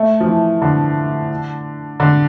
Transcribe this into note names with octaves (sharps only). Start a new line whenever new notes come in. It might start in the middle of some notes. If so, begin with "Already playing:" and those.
Already playing: A3
F3
E3
D3
D3